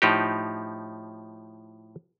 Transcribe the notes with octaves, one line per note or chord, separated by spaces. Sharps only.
A2 F3 D#4 G4